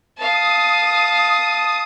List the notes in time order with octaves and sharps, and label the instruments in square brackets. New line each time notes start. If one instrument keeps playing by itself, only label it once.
[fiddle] F5 A5 [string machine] D#6